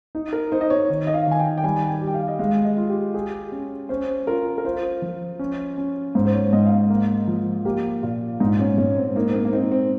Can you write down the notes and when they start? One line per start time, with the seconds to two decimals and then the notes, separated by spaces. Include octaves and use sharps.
0.15 D#4
0.33 A#4
0.52 D#4 C5
0.61 D#5
0.70 C#5
0.90 D#3
1.07 D#5
1.14 F5
1.27 D#3 G#5
1.39 G5
1.58 G5
1.64 G3 G#5
1.89 G5
2.01 G4
2.07 G5
2.14 F5
2.28 D#5
2.39 G#3 F5
2.64 D#5
2.77 F4
2.90 G4
3.14 G4 G#4
3.52 C#4
3.89 C#4 C5
4.27 F4 A#4
4.58 A#4
4.65 F4 C5
5.02 F3
5.39 C#4
5.78 C#4
6.15 G#2 C5
6.25 C5
6.34 C#5
6.53 G#2 D#5
6.66 F5
6.71 D#5
6.90 A#3
7.28 F3
7.65 A#3 G4
8.03 A#2 F4
8.40 G#2 D#4
8.59 C#4
8.78 G#2 C#4
8.97 C4
9.07 C4
9.16 A#3 D#4
9.30 C4
9.34 A#3
9.45 A#3
9.53 C4 D#4
9.72 C4